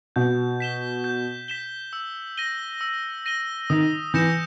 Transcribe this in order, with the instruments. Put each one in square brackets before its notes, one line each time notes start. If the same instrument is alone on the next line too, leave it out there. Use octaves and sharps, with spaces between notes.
[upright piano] B2 [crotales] G6
[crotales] B6 E7 G7
G6
B6 E7 G7
E6
A#6 D#7 G7
E6
A#6 D#7 G7
[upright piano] D#3 [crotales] D#6
[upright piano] E3 [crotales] G6 A#6 C#7 E7